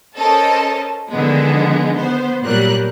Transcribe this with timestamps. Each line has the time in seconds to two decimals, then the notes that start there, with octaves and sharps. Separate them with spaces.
0.16 C#4 A4 A#4 C5 D#5 A5
1.10 D3 D#3 F3 G#3 B3
1.95 B3 C5
2.43 A#2 F#3 G3 A#4 F#6